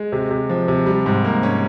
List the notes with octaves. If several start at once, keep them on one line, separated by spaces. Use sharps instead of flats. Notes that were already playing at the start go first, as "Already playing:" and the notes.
Already playing: G#3
C3
C3
F3
C3
G3
G#2
A#3
C#4